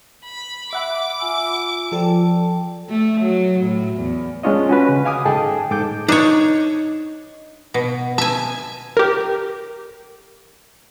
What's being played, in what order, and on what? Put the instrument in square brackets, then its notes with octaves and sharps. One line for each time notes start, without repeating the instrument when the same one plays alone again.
[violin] B5
[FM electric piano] E5 F#5 B5 [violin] D6
[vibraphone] F4 G#5 E6
[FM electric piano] F3 A4 [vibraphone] D5 G5 A5
[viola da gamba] A3
F#3
A2
E2
[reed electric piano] G#3 C#4 D4 F4 C#5 D#5
C#4 F#4 B4
C#3
F5 G#5 D6 D#6
G#2 G#4 A4 D#5 G5 A5
G#2 A4 D6 G6
[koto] D4 C#5 [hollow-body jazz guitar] D#4 D#5
[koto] B2
[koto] E5 G#5 [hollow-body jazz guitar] A5
[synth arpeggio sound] G4 A#4